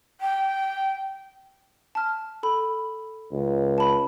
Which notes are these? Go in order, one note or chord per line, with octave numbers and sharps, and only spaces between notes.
G5
A5 F6
A4 B5
C#2
A5 B5